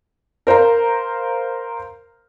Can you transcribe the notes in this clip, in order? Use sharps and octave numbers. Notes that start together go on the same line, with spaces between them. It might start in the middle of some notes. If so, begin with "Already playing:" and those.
A#4 C5 F5 A#5